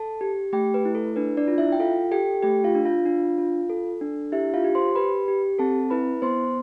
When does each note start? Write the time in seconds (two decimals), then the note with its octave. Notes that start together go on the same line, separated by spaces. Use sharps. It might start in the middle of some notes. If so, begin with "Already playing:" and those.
Already playing: A4 A5
0.21 G4
0.53 A3 G4 G5
0.74 B4
0.85 E4
0.95 A4
1.16 D4 B4
1.37 D4 D5
1.48 F4
1.58 E4 E5
1.72 G5
1.80 F4 A4 F5
2.12 G4 A4 G5
2.42 A3 G4 G5
2.64 F4 F5
2.75 D4
2.85 F4 F5
3.06 D4
3.38 F4
3.70 A4
4.01 D4
4.32 E4 G4 E5
4.54 F4 F5
4.64 G4
4.75 C5 C6
4.95 G4 B4 B5
5.28 G4
5.59 C4 A4 A5
5.90 E4 B4 B5
6.22 B3 C5 C6